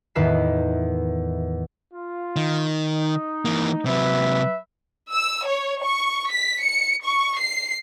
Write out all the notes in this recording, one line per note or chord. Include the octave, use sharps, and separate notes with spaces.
E2 A2 D#3 B4 E5 C7
F4
D#3
D#4
E3 A#3
C3 F#3 B4 E5
E6
C#5
C#6
B6
C#7
C#6
C7